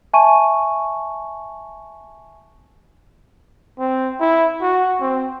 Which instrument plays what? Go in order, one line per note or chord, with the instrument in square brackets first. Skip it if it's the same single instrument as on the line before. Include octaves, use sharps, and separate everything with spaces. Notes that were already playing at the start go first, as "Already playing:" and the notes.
[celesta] E5 G#5 A5 C#6 D#7
[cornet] C4
E4
F#4
C4